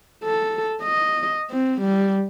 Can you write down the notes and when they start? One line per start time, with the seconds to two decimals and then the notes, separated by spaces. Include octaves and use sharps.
0.24 A4
0.82 D#5
1.51 C4
1.82 G3